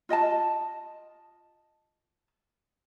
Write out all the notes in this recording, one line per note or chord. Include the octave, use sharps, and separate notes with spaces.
F4 D#5 G5 A5